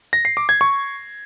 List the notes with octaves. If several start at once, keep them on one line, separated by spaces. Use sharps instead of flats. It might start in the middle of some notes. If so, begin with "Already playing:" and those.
A#6
C7
D6
G#6
C#6